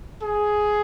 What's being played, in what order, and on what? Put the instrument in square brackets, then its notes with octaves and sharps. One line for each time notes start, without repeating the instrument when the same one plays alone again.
[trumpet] G#4